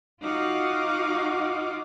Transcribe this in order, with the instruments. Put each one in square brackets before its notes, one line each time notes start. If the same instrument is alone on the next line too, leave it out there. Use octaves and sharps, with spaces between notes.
[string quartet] D#4 F4 F#4 F5 F#5 D6